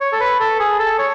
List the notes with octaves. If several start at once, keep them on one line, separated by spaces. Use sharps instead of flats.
C#5
A4
B4
A4
G#4
A4
C#5